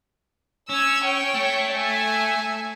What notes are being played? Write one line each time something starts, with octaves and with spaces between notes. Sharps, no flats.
C#4 E6 G#6
C#5 G5
A3
E5 G#5